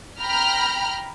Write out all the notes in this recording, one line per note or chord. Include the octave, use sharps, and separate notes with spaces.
G5 A#5 B5 F6